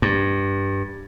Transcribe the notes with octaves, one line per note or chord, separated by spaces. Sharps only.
G2